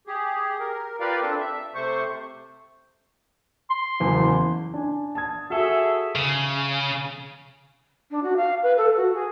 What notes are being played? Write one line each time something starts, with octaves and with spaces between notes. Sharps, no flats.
G4 G#4
A#4
F4 G4 A#4 B4 D5 F5
C4 D4 A4
E5
C3 A3 C5 C#6
C6
F#1 E2
D4 G#5
A5 D#6 G#6
F#4 G#4 A4 E5
C#3
D4
F#4
F5
B4
A4
F#4
G#4